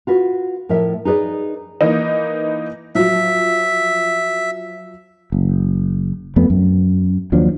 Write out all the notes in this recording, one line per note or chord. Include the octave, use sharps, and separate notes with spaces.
F4 F#4 B4
A2 F3 A#4 E5
D#4 G#4 B4 D5
E3 A#3 D#4
F3 F#3 E5
F#1
F2 A3 B3
F#2
D#2 F3 F#3 D4